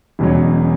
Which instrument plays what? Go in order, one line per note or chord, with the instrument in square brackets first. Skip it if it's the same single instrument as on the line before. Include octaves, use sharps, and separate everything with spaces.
[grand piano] E1 E2 B2 F#3 C#4